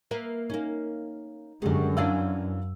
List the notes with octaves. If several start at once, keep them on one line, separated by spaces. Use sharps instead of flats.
A#3 B4 E5
A#3 C#4 D#4
F#2 D3 D#3 G3 G#3
E3 C#4 D4 F5 E6